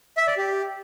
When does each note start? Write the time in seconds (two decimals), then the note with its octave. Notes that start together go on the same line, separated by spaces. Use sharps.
0.17 E5
0.27 D5
0.37 G4